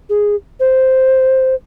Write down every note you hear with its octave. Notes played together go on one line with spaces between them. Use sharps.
G#4
C5